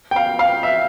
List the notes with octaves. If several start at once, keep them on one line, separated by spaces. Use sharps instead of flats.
G5
F5
F5
E5